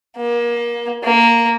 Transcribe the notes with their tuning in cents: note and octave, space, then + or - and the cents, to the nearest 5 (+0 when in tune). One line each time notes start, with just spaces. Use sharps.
A#3 +30
A#3 -5